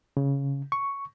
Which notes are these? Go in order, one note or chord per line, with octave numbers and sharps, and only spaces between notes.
C#3
C#6